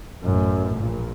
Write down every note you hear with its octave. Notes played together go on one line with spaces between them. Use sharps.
A1 F#2
A#1 A#2